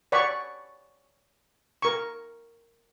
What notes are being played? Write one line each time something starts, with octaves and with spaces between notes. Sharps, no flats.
C#5 D5 F#5 B5 C#6
A#4 C#6